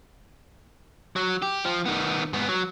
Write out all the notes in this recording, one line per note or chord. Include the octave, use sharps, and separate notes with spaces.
F#3
G4
F3
D#3 B3
G#2 B3
F#3